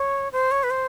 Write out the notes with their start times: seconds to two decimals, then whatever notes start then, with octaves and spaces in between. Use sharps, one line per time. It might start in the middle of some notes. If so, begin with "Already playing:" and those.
Already playing: C#5
0.32 C5
0.51 C#5
0.63 B4
0.70 C5